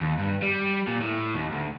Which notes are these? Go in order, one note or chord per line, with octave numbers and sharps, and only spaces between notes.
D#2
G2
G3
A#2
A2
D#2
D2